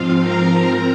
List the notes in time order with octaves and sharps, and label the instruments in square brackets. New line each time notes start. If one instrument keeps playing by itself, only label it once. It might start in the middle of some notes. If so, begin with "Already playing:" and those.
Already playing: [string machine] G#2 F3 C4 F4 F5
A#4 A#5
C4